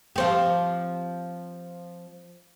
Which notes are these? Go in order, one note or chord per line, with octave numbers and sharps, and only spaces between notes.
F3 C4 G4